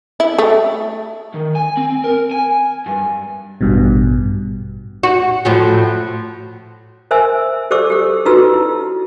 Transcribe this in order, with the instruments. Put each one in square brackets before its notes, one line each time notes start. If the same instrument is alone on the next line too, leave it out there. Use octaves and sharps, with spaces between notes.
[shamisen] E4
A3
[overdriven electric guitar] D#3
G#5
C4
A#4
G#5
G2
[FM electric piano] A1 G2 B2
[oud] F#4
A2 F3 F#3
[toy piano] A#4 C5 E5 G#5 E6
G4 A4 C5 D5 D6 E6
G4 A4
D#4 F4 F#4 A4 B4 E6
E4